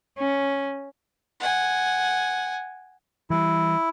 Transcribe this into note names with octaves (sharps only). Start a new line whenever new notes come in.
C#4
F#5 G#5
E3 G3 E4